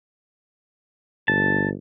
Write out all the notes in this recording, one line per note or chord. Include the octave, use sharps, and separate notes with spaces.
G1 A5